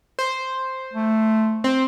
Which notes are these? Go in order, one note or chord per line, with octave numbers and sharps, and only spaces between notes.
C5
A3
C4